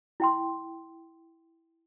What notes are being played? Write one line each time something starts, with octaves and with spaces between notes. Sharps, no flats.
E4 G5 C6